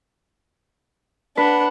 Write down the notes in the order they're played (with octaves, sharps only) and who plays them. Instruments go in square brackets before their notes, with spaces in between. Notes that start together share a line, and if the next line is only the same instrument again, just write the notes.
[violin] D4 F#5 [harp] B4